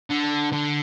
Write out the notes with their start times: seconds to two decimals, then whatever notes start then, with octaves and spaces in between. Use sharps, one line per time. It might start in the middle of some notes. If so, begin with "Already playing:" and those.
0.10 D3
0.52 D3